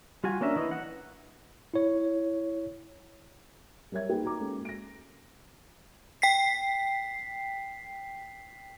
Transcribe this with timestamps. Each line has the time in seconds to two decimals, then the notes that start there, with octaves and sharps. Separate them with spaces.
0.24 G3 F4 F#4 G#5
0.41 A#3 C#4 D4 A#4 E5
0.56 E3 D#5
0.71 F#5
1.74 E4 C#5
3.92 G3 A#4 C#5 E5 G#6
4.09 A#3 D#4 G4 G#4 B4 G5
4.23 F#4 A#5 D6
4.40 G#3 A#3 C#4 F#4 A4
4.65 A#6 D7
6.22 G5 B6 C7